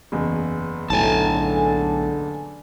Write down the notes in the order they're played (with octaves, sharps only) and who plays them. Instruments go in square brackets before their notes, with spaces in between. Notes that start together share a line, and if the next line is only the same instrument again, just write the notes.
[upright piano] F#1 E2
[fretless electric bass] B1 A2 [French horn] D3 [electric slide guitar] G#5 A5